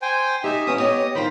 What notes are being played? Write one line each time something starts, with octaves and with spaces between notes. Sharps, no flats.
C5 G5 G#5
D#4 G4 E5 G#5
B3 C#4 E4 D#6
A3 B3 G4 C#5 D#5 D#6
D#3 F4 C5 G5 B5